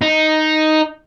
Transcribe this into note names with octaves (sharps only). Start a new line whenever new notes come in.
D#4